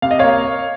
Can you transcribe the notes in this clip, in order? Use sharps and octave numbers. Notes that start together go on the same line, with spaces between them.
C3 F5
D#5
A#3 C#5 F5